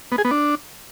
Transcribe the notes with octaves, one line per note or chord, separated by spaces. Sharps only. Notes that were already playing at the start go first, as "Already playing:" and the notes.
B3
G#4
B3
D4